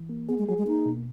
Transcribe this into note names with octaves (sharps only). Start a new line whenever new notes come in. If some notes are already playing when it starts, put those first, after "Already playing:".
Already playing: E3
A#3
B3 G#4
G#3
F#3 G#4
G#3
A#3 D#4
B2